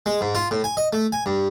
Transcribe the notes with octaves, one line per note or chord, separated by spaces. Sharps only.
G#3
G#2
F4
A2
G#5
D#5
A3
G#5
G2